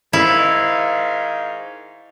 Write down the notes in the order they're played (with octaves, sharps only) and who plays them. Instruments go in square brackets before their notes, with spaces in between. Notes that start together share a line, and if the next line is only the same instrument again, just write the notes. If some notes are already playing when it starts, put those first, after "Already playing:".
[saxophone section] G#2 D#3 F5 [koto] E4